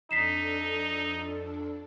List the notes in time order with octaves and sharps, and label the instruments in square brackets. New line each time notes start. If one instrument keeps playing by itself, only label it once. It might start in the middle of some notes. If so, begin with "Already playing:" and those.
[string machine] F2 D4 A4 [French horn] D#4 [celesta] B6 C7 E7